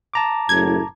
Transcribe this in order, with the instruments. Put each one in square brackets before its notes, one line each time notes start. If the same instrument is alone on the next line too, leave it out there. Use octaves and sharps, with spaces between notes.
[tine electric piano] A5 A#5 D6
[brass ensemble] F#1 A2 [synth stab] G#6